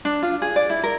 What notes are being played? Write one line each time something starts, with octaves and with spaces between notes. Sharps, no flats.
D4
F4
G#4
D5
E4
A#4